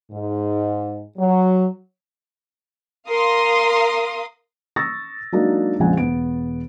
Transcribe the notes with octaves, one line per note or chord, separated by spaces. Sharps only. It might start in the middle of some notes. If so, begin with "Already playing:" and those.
G#2
F#3
A#4 F5 C6 D#6
C#6 D#6 E6 A6 A#6
F#3 G#3 A#3 D4 D#4 F#4
A#1 F2 C#3 G#3 F#5 G#5
E1 B3 D7